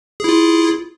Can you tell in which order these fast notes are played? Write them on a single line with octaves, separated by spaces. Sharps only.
G#4 E4 F4